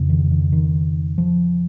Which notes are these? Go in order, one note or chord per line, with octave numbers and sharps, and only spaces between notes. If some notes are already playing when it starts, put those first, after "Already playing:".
Already playing: F2 C#3
D#3
D#3
D#3
F3